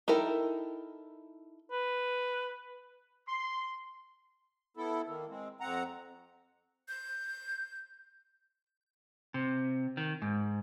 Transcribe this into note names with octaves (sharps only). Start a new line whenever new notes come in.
D#4 E4 A4 A#4 G5
B4
C6
B3 E4 A4
D#3 A#3
G#3 C4
F2 C4 F#5 A#5
G6
C3
D#3
G#2